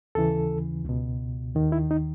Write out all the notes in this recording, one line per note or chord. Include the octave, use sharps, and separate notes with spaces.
D#2 C#3 E3 A4
C#2 B2
D#2 D#3
E4
D#4